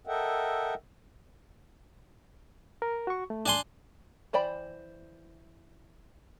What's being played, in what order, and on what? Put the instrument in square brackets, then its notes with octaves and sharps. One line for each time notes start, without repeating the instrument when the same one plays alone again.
[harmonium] A4 A#4 D#5 E5 F#5 G5
[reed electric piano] A#4
F#4 C#6
A3
[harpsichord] D4 G#5 C6
[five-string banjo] E3 C5 D5 G5 B5